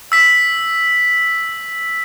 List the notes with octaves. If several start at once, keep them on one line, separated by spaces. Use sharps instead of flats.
E6 B6